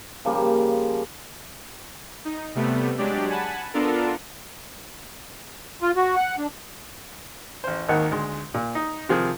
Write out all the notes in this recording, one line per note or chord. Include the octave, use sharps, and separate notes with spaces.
C#3 F3 G3 A#3
D#4
C3 G3 A3 B3
F#3 G#3 D4 G4 D5
F#5 G#5 A5 B5
B3 D4 F4 A4 A#4
F4
F#4
F#5
D4
A1 C5
G#1 D#2 D#3 A#3 F#5
D2 G#3 C6
A#2
D#4
C3 D#3 F3 G#4